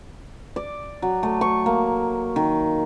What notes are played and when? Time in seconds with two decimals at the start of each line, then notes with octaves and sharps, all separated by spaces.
0.56 D5
1.02 F#3
1.23 A3
1.41 C#6
1.66 A#3
2.36 D#3